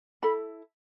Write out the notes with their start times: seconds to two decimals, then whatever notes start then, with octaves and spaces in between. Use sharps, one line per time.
0.22 E4 A4 B5